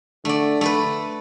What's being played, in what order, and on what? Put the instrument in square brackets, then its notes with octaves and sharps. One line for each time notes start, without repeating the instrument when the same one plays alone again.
[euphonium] D3 [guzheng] A3 D5
[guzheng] A3 A4 B4